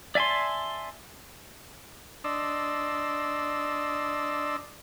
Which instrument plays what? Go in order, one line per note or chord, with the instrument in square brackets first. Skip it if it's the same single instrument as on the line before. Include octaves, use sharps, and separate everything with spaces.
[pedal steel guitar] D5 E5 G#5 A5 C6
[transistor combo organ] D4 D5 D#5 C6 E6